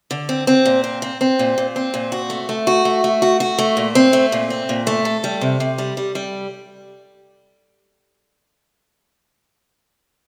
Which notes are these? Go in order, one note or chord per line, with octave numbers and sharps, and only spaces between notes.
D3
C4
C4
A#2
C4
C4
C4
A#2
A#2
C4
A#2
F#4
A3
A3
F#4
A3
A3
F#4
F#4
A3
A#2
C4
A3
A#2
C4
A#2
A3
A4
G3
C3
C3
G3
G3
G3